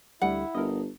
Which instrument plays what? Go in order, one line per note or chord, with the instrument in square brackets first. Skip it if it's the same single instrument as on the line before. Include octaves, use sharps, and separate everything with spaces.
[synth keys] D2 D3 G3 [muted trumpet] E4 [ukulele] F#5
[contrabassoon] G1 [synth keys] A#4 D#5